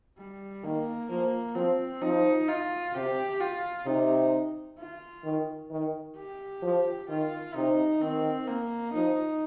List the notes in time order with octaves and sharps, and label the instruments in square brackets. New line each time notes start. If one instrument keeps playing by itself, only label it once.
[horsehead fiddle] G3
[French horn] D#3 [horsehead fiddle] A#3
[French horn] F3 [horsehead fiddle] A#3
[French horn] F3 [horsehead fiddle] C4
[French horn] F3 [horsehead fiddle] D#4
[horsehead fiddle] F4
[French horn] C3 [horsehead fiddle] G4
[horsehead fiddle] F4
[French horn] C3 [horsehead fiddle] D#4
[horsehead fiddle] F4
[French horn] D#3
D#3
[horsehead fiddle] G4
[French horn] F3
[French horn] D#3 [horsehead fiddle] F4
[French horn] C3 [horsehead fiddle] D#4
[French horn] D#3 [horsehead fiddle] C4
[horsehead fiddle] A#3
[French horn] F3 [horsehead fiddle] D#4